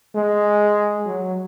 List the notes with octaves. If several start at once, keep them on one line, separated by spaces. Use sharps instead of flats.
G#3
F#3